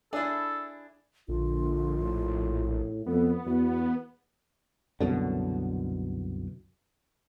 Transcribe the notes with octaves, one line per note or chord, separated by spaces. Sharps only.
D4 E4 G#4 A4
A#1 D3 F4
A2
F2 B3 A4
E2 F#4
C2 F#2 B2 D3